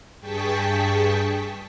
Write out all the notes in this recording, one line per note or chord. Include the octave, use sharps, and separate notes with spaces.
G2 G#4 G5 A5 C#6 B6